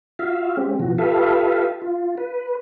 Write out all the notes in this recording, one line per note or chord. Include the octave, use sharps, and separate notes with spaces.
F4 F#4 E5 F5
G#3 C4 C#4 G4
B2 E3 F3 F#4
F4 G4 A4 B4 E5 F5
F4
B4